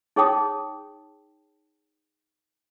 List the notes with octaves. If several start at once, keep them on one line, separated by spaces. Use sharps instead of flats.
D#4 G#4 C#5 G5 A5 D#6